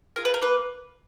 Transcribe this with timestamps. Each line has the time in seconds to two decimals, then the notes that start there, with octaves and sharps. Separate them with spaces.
0.16 F4 G#4 A#4
0.25 B4
0.34 A#4
0.42 A#3 B4